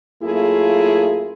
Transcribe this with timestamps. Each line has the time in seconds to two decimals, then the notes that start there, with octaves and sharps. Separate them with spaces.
0.22 F#2 A3 A#3 E4 F4 G#4